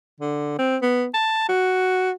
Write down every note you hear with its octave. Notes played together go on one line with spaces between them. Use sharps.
D3
C4
B3
A5
F#4